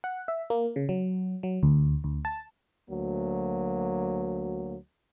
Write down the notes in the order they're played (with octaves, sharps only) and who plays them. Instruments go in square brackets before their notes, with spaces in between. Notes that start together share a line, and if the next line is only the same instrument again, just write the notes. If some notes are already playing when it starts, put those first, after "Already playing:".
[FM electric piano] F#5
E5
A#3
C#3
F#3
F#3
D2
D2
A5
[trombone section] D2 F#3 A#3